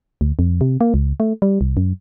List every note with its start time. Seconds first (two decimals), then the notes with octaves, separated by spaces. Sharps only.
0.21 D2
0.39 F2
0.61 C3
0.81 A#3
0.94 C#2
1.20 A3
1.42 G3
1.61 C2
1.77 F#2